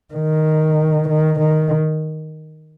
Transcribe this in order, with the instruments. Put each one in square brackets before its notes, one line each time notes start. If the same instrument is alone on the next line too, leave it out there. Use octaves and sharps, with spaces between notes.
[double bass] D#3
D#3
D#3